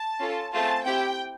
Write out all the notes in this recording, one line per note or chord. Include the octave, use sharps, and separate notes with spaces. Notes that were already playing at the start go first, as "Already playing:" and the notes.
Already playing: A5
C#4 F4 A4
A3 C4 F4 G#4 A5
C4 E4 G4 G5